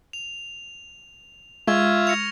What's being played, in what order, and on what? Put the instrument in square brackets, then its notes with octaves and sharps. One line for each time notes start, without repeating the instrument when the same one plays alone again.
[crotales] F7
[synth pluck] G#3 [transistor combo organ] F4 E5 [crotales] C#6 F6 G#6
[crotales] A#6 C#7 F7